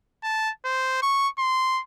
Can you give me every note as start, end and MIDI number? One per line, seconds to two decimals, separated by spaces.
0.24 0.51 81
0.65 1.00 72
1.02 1.28 85
1.39 1.82 84